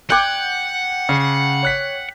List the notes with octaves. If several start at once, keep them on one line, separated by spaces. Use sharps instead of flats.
F#5 G5 D6 F#6 G#6
C#3
C#5 F#6 B6